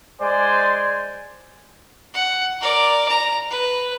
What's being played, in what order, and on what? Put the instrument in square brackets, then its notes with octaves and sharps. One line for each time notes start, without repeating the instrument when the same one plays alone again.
[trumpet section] G#3 C5 D5 G#5
[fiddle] F#5
A#4 D5
A#5
B4